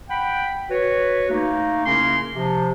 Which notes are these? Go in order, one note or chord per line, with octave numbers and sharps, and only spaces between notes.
F#5 G5 B5
F#4 B4 C#5
A3 A#3 D#4
C#3 A#3 C#4 E4 A#4 C6
C3 F3